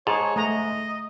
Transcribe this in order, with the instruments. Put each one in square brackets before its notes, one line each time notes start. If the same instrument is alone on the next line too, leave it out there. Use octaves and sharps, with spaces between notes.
[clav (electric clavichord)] G#2 [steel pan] G#4 A5 [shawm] C#5
[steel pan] A3 A#5 [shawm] D#5